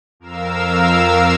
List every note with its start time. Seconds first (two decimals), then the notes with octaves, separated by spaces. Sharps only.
0.20 F2 A#4 F5 E6